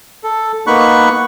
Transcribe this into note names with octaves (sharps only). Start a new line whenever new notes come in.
A4
A#3 B3 D#4 B5 C#6 F#6